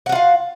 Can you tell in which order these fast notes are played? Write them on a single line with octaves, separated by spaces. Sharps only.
F#5 F#4 F4 F5